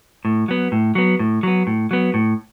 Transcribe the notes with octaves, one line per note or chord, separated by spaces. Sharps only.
A2
F#3 B3
A2
F#3 B3
A2
F#3 B3
A2
F#3 B3
A2